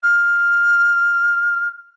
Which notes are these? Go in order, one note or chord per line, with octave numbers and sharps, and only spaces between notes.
F6